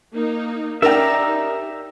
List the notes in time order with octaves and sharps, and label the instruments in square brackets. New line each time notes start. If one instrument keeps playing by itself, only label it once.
[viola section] A#3 D#4
[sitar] C#4 G4 D5 [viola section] D#4 [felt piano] A#4 G5 [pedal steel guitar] E5 A#5